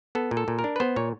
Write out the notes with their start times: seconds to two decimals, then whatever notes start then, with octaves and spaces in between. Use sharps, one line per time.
0.15 B3 A4
0.31 A#2
0.37 A4
0.48 A#2
0.59 A#4
0.64 D4
0.76 B4
0.80 B3 C5
0.96 A#2 C#5